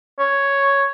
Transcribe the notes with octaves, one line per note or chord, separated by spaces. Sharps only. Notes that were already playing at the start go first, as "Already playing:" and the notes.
C#5